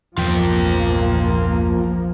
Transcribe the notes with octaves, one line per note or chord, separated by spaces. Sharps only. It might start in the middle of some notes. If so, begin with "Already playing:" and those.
A#1 E2 G2 A#2 F3 A#3 F4 G5